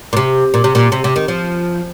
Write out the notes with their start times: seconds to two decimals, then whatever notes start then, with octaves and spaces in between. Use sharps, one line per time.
0.13 A#2
0.17 C3
0.54 A#2
0.64 C3
0.75 A#2
0.92 C3
1.04 C3
1.16 D#3
1.28 F3